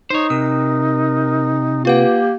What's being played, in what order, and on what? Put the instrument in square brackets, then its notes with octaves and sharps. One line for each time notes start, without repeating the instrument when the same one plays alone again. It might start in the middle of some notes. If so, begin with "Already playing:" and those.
[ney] D#4 [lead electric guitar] C5 C#5
[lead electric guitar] C3 [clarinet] A#4 [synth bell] D#6
[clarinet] A#3 [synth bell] F4 B4 F#5 [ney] G4